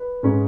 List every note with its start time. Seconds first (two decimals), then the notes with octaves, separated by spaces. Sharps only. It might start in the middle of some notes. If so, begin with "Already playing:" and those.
Already playing: B4
0.23 G#2 G#3 C#4